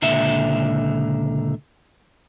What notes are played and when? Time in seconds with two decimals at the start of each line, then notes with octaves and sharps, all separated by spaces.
0.02 C#2 A#2 D3 E5